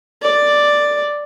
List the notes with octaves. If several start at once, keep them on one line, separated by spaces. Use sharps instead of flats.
D5